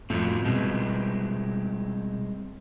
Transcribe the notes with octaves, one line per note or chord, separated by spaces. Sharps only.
F2 A2 C4 F4 F#4
B2 G3 G#3 C4